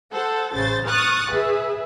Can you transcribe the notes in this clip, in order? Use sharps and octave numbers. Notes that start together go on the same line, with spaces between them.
A4 C5 F#5
A1 C#3 C5 A6
C#6 D#6 F6 F#6 A6
G#4 B4 E5